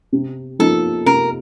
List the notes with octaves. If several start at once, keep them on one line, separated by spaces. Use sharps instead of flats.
C3
F3 A#3 D#4 A4
C3 A#4